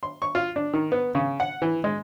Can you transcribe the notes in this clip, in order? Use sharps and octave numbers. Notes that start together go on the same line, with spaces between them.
C6
C#6
F4
D4
D#3
B3
C#3
F#5
E3
G#3